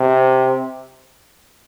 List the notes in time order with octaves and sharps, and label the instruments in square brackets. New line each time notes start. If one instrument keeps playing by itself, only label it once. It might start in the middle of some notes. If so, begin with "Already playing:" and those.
Already playing: [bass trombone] C3